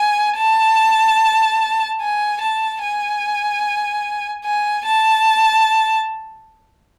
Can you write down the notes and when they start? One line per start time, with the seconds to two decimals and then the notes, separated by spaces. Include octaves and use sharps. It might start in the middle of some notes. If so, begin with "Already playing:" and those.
Already playing: G#5
0.38 A5
2.01 G#5
2.41 A5
2.82 G#5
4.45 G#5
4.85 A5